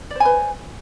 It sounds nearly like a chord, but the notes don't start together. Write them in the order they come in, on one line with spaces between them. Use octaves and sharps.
D5 C5 G#5 B4